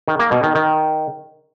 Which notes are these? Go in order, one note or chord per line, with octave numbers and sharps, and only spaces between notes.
D#3
A#3
B2
D#3
D#3